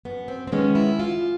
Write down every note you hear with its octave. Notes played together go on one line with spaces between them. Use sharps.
F#2 B3
C4
C4
D#3 G#3 B3 C#4
E4
F#2 F4